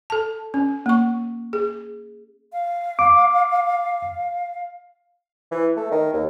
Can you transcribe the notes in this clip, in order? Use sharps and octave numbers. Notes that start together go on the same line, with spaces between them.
A4 A5
C#4
A#3 C#6
G#4
F5
D6
E3
A3
D#3
D#2